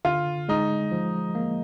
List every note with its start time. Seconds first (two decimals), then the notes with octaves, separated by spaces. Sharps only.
0.05 D3 F4
0.49 G#3 D#4
0.91 F3
1.35 A#3